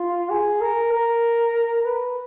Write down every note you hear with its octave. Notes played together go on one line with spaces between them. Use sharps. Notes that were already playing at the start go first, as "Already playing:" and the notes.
Already playing: F4
G#4
A#4
A#4
B4